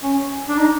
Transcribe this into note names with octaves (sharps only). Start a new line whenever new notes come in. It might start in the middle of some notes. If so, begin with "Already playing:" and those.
C#4
D4
D#4